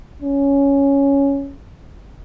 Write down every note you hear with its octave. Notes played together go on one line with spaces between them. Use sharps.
C#4